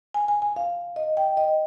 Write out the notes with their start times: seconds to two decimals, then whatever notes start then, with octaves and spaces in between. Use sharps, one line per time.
0.14 G#5
0.28 G#5
0.42 G#5
0.56 F5
0.96 D#5
1.17 G5
1.37 D#5